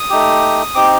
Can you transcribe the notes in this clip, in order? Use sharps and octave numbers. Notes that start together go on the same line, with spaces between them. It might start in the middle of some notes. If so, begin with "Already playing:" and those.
Already playing: D#6
A3 D#4 G4
C4 D#4 G4 D6